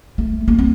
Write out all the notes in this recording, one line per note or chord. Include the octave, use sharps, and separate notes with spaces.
A3
A#3
C4